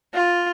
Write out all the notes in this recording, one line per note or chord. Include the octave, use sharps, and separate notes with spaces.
F4